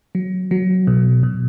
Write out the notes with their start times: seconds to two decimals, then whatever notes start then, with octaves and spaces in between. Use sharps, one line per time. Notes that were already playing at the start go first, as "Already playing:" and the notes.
0.15 F#3
0.51 F#3
0.87 B2
1.23 B2